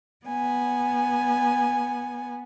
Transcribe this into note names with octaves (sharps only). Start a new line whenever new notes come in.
B3 G#5